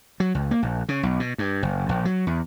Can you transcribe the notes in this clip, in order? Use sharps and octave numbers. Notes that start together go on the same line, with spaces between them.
F#3
C#2
A#3
A#1
C#3
B1
B2
G2
F#1
A#1
F#3
E2